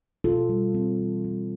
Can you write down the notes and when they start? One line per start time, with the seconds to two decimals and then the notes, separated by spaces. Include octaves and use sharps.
0.24 B2 F4 A4
0.49 G3
0.75 C4
0.99 E3
1.24 G3